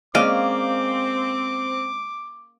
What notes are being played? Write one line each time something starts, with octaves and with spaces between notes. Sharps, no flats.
G#3 A#3 C4 C#4 D5 D#5 F5 D6